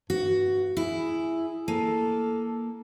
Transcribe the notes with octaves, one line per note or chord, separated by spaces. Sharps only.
G2 F#4
E4 G#4
A#3 A4